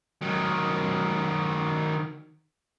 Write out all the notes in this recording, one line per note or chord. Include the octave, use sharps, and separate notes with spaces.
D#3 F#3